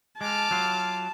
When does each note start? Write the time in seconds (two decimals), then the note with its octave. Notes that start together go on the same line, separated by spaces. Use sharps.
0.21 G#3 A5 D6 F6
0.51 F#3 F4